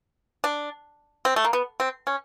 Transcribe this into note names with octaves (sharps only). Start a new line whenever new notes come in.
D4
C4
A3
A#3
B3
C4
C#4